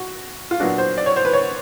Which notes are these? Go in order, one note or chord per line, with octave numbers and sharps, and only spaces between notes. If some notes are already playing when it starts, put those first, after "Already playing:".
Already playing: F#4
F4
A#2 F#3 B3 D4 F#4
C5
D5
C#5
C5
B4
C#5